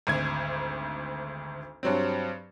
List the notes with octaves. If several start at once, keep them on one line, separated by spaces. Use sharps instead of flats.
G#1 D2 G#6
G2 F#3 C4